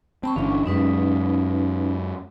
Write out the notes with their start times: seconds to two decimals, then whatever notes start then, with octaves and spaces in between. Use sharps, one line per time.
0.23 C4 A5 B5 C#6
0.36 G1 E3 C#4 D4 C#6
0.66 F#2 G#3 C#4 D#4 B4